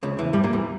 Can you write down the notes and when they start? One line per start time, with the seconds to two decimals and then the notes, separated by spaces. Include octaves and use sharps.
0.03 C#2 C#3
0.18 E2 E3
0.33 G2 G3
0.44 A#2 A#3
0.53 E2 E3